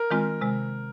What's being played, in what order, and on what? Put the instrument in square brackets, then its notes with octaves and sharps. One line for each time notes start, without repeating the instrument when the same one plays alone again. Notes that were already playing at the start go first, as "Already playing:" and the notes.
Already playing: [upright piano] A#4
[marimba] D#3 G#3 C4 F4
C3 G#3